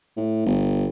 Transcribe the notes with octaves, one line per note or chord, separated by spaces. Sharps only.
A2
G1